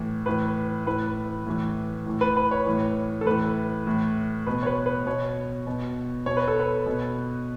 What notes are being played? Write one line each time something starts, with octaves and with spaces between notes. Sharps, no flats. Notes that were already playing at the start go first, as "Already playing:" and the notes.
Already playing: A2 E3
A2 E3 B4
A2 E3 B4
A2 E3
A2 E3
B4
B4
C#5
A2 E3
A4
A2 E3 B4
A2 E3
B2 B4
C#5
B4
B4
B2 C#5
B2
B2 C#5
B4
A4
B4
B2